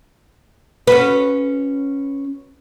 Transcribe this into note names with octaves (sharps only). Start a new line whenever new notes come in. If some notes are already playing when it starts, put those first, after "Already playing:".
C#4 F#4 B4